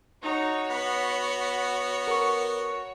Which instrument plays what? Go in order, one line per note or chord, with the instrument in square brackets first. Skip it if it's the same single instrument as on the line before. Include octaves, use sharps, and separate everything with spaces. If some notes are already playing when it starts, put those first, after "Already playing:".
[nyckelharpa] D#4 [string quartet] F#4 C#5
[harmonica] B3 [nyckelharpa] B5
[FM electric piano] A#4 C#6